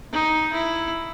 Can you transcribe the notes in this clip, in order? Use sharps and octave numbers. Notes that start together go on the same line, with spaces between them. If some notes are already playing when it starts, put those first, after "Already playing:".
D#4
E4